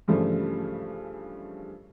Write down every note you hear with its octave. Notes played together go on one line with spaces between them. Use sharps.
G2 C#3 E3 F3 G3 A3